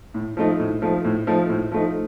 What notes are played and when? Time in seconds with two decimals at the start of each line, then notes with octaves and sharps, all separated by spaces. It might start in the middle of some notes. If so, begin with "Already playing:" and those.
0.14 A2
0.37 F3 A3 D#4
0.59 A2
0.82 F3 A3 D#4
1.05 A2
1.27 F3 A3 D#4
1.49 A2
1.72 F3 A3 D#4